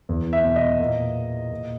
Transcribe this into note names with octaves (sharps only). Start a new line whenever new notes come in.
E2
E5
B2
D#5
A#2
A#2